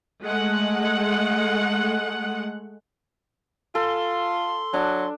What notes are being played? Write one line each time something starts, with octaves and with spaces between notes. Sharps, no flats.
G#3 A3 F#5
F4 A4 C6
F#3 D4